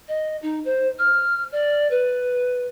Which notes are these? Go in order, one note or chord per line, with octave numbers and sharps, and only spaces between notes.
D#5
D#4
C5
F6
D5
B4